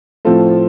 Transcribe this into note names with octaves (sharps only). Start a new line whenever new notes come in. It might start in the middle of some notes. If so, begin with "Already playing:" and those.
A2 F3 C4 F4 A4